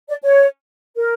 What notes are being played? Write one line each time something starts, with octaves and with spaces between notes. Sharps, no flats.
D5
C#5
A#4